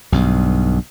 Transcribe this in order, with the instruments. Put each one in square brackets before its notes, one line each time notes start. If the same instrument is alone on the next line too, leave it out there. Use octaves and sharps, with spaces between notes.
[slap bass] B1 G2